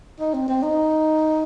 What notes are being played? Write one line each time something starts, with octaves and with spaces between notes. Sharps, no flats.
D#4
C4
C4
D#4